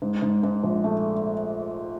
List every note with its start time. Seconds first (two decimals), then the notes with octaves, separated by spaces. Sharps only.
0.02 G#2
0.22 G#2
0.43 G#2
0.63 A#1
0.84 A3